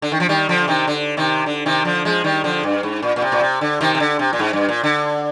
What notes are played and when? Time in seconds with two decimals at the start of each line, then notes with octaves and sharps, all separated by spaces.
0.02 D3
0.12 D#3
0.20 F3
0.29 D#3 G3
0.49 D3 F3
0.68 C3 D#3
0.88 D3
1.17 C3 D#3
1.46 D3
1.66 C3 D#3
1.85 D3 F3
2.05 F3 G#3
2.24 D#3 G3
2.44 D3 F3
2.63 G2
2.83 G#2
3.02 A#2
3.16 A#2
3.22 C3
3.32 A#2
3.41 C3
3.61 D3
3.81 C3 D#3
3.95 C3
4.00 D3
4.19 C3
4.33 A#2
4.39 G#2
4.53 G2
4.69 A#2
4.83 D3